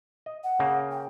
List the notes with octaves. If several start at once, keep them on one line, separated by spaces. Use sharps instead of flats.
D#5
F#5
C#3 A#3
G5